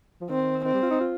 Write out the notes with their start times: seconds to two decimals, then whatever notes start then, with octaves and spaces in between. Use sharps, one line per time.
0.21 F3
0.29 D#3 C4
0.65 D#3 C4
0.74 G3
0.83 F4
0.91 D#4
1.00 F4